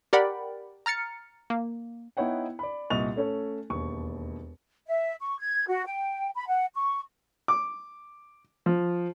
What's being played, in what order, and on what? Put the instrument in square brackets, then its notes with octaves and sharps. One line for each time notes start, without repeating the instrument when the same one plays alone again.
[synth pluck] G4 A#4 D5 F#5 G5 B5
A#5 F6 A6 C#7
A#3
[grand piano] B3 D#4 E4 C#5 F#5 G5
D5 B5
C2 A#2 D#5 C#6 A6 F7
A3 C#4 A4 C#5
E1 D#2 C#6
[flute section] E5
C#6
G#6
F#4
G5
B5
F#5
C#6
[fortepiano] D6
F3